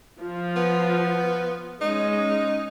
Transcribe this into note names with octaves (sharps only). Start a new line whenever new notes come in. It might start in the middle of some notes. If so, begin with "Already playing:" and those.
F3 F4
B3
G#3 C#4 D#4